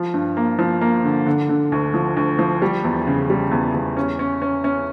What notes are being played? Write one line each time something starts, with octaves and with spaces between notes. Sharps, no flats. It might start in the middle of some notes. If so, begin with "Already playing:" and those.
Already playing: F3
G2
A#3
F3
A#3
D3
D3
D3
D2
F3
D2
F3
G3
E2
C#3
G3
E2
E2
C#4
C#4
C#4
C#4